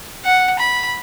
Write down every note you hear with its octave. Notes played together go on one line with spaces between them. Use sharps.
F#5
B5